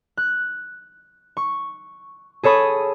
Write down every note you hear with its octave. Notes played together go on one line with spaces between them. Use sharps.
F#6
C#6
G#4 A4 C#5 B5 D#6